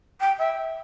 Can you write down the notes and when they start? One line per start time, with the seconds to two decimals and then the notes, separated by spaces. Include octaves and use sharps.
0.20 G5
0.38 E5